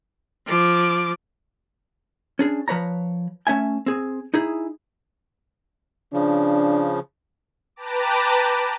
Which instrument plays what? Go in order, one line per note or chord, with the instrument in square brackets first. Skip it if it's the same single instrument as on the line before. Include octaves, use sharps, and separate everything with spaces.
[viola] F3 D6
[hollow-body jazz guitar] C#4 D4 G#4
F3 B4 C#5 A#5
A3 C#4 E5 G#5
C4 G#4
D#4 E4 G#4
[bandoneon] C#3 F3 [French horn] D4
[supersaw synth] B4 G5 A5 A#5 D6